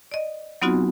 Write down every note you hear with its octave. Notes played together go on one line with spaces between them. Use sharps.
D5 D#5
F#3 B3 C4 D#4 F4 F#4